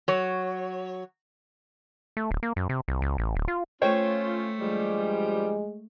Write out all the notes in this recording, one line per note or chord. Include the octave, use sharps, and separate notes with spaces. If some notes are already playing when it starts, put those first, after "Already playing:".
F#3 C#5
A3
D1
A#3
F#2
C3
C2
C#2
A1
D1
F4
A3 C#4 F4 C5 C#5 G5
G2 F3 G3 G#3